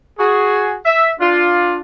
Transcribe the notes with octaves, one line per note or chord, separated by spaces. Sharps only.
F#4 G#4
E5
D4 F4